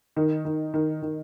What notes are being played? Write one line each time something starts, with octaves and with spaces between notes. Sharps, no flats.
D#3
D#3
D#3
D#3